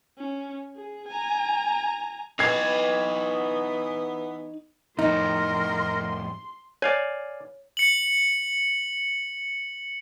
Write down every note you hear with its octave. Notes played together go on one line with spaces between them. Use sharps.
C#4
G#4
G#5 A#5
E3 B3 D#4 B4 G#6 C7
F2 A2 D#4 A#4 C6
C#5 D5 F5 G#5
C#7 F#7